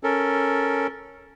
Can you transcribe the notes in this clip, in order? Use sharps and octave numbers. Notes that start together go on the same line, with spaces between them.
C#4 A4 A#4